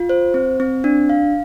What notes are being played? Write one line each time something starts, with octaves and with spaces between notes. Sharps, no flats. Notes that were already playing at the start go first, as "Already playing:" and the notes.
Already playing: F4
C5
C4
C4
D4
F5